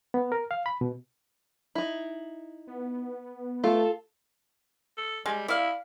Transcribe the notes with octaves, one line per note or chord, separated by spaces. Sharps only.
B3
A#4
F5
B5
B2
D#4 E4
B3
A3 F4 A4
A4
G3 G#3
E4 D5 F5